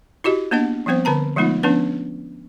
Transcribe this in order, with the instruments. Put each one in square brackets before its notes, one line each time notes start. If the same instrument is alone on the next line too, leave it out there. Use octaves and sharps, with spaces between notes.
[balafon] E4 F#4 G4 D#5
A#3 B3 D4 D#5 F#5
F3 G3 B3 C4 C5
D3 B4 A5 A#5
F3 G#3 A3 B3 D#4 F4
F3 B3 C#4 D4 B4